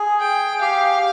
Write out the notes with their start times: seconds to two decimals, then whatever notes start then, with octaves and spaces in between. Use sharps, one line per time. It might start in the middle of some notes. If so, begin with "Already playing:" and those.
Already playing: G#4
0.20 G5
0.61 G4 F5